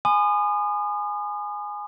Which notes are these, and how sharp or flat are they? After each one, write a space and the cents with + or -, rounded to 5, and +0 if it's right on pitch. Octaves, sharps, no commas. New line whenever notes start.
G#5 +0 B5 +45 D#6 -35